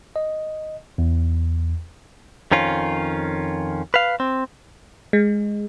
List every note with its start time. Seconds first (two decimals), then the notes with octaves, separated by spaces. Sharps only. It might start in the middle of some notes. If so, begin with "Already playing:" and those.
0.16 D#5
0.98 E2
2.51 F2 D#3 C#4 F4
3.94 B4 F5
4.20 C4
5.13 G#3